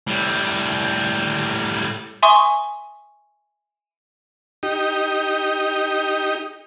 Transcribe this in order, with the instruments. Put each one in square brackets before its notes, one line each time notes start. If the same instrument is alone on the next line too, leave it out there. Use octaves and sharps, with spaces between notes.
[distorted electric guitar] A2 G3
[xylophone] E5 G#5 C6 C#6 D#6
[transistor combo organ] D#4 G4